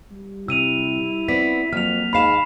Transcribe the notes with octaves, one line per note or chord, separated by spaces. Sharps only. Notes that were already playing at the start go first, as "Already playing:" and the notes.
G3
C3 E4 E6 D#7 F7
B3 C4 D5 B6
F2 F#3 A#3 F6 F7
D#2 G#2 F5 B5 C7 E7